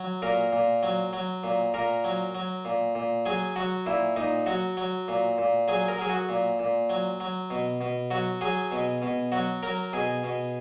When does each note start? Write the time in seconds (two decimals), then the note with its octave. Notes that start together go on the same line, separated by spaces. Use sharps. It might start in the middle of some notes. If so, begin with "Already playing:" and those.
Already playing: F#3
0.22 A#2 A#4
0.52 A#2
0.83 F#3
1.13 F#3
1.44 A#2
1.74 A#2 A#4
2.04 F#3
2.35 F#3
2.65 A#2
2.95 A#2
3.26 F#3 G#4
3.56 F#3 F#4
3.86 A#2 E4
4.16 A#2 D#4
4.46 F#3 F#4
4.77 F#3
5.08 A#2
5.38 A#2
5.68 F#3 G#4
5.88 A#4
5.99 F#3 G#4
6.09 F#4
6.29 A#2
6.59 A#2
6.90 F#3
7.20 F#3
7.50 B2
7.81 B2
8.11 F#3 F#4
8.41 F#3 G#4
8.72 B2
9.02 B2
9.32 F#3 F#4
9.63 F#3 A#4
9.93 B2 G#4
10.24 B2